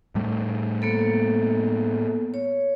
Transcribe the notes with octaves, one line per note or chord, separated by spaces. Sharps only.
A2 G3 A3
A#3 B3 A4
C#5